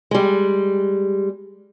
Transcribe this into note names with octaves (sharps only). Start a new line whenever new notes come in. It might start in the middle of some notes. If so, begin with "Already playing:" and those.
G3 G#3